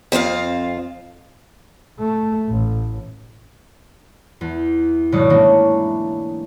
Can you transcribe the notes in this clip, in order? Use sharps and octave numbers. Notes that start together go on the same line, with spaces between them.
F2 C4 F4 F5
A3
A1
E2
G#1 B2 F#3 C#5 D5 D#6
E3 A3 A#3 C#4 D4